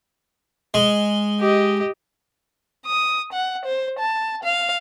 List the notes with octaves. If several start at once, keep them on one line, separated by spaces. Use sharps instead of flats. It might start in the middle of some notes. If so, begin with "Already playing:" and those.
G#3
G4 D#5
D#6
F#5
C5
A5
F5